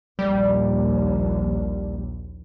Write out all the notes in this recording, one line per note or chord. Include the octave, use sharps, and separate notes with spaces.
A#1 D#2 G3